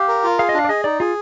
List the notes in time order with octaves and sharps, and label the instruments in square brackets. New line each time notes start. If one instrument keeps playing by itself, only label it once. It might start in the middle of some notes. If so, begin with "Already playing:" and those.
Already playing: [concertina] G4 [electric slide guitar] F5
[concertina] A#4
F4
[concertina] G#4 [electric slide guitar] F5
[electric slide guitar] D#5
[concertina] D4 [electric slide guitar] F5
[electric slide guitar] D5
[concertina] G#4 [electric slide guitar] D#5
[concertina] D#4 [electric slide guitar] D5
[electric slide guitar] F4 [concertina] G#4